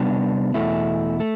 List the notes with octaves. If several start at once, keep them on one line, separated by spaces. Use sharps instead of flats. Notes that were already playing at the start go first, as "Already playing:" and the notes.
Already playing: C3 G3 B3 D4
E2 B2 A3 E4
A3